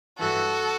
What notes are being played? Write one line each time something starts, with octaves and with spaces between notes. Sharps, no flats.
G2 E3 F#4 A4